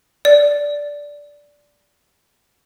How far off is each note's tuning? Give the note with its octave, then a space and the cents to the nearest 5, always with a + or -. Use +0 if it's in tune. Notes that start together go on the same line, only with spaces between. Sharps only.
D5 -10